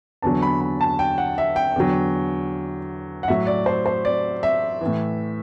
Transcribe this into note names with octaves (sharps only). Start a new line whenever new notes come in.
E2 D3 F#3 A5
B5
B5
A5
G5
F#5
E5
G5
E2 D3 F#3
F#5
A2 F#3 E5
D5
C5
C5
D5
E5
A2 E3